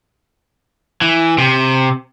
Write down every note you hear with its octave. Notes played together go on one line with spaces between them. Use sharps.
E3
C3